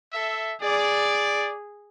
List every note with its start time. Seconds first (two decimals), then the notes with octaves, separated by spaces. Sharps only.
0.13 A4 E5
0.62 G#4 D5